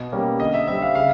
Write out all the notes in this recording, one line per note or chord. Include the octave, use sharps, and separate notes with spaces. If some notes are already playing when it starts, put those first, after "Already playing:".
Already playing: B2
G3 A#3 C#4
D3 D#5
E5
G3 C4 E5
F5
C#3 F5